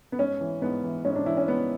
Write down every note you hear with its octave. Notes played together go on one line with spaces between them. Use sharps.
B3
G#2 C#4
E3
G#2 B3
E3
G#2 C#4
D4
E3 E4
C#4
G#2 B3